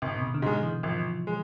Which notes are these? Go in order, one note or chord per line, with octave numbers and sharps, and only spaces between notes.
G#1 C3
B2
C3
D3
G#2 C3 G#3
E3
G#1 F3
G#3